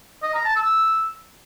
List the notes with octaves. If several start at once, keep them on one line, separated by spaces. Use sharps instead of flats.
D#5
A#5
A5
E6